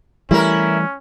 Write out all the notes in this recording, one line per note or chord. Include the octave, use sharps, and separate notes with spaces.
E3 G3 A3 C#4 E4 A#4